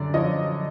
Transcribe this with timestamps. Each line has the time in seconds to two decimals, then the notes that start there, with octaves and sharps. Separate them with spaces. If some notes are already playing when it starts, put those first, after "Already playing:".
Already playing: F#2 D3 D5
0.14 F3 C#5 D#5